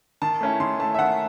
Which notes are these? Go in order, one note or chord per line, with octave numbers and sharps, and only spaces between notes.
D#3 A5
A3 C#4 E4
D#3 C6
A3 C#4 E4 A5
E5
D#3 F#5